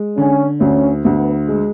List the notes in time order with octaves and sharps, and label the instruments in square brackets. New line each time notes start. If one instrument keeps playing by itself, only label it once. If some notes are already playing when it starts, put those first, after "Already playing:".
Already playing: [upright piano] G#3
[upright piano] D3 [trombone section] C#4
[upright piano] D2 [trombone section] C#4
[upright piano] D2 [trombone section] B3
[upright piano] G#3